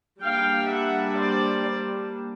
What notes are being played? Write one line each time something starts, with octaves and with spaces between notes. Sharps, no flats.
G3 A#3 D4 F5 G5
E5 F#5
C5 D5